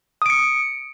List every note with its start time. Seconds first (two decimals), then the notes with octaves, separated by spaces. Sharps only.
0.22 D#6
0.26 D7
0.30 C#7